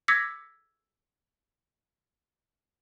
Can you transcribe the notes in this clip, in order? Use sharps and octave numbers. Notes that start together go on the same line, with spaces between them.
D6 E6 G#6 A#6 B6 C#7